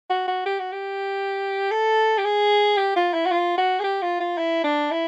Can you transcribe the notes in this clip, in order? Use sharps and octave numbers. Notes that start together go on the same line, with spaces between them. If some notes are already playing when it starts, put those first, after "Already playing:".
F#4
F#4
G4
F#4
G4
A4
G4
G#4
G4
F4
E4
F#4
F4
F#4
G#4
G4
F4
F4
E4
D4
E4